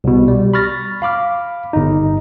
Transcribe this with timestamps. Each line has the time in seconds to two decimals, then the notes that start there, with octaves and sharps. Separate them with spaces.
0.04 C2 B2
0.28 G3
0.54 B5 C#6 F6 A6 A#6
1.02 F5 B5 D6 F6
1.73 G1 D#4